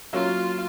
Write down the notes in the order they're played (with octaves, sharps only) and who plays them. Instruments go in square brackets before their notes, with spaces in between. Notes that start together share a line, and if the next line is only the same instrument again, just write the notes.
[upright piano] F#3 A#3 C#4 [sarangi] F4